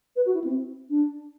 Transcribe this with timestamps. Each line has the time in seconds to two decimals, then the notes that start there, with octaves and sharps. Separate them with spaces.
0.16 B4
0.26 F#4
0.34 E4
0.44 C4
0.90 D4